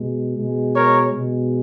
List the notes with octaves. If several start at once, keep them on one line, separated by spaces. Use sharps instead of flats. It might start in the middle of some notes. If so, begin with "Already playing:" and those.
Already playing: B2 G#3
B2 G#3
A#4 C#5
B2 G#3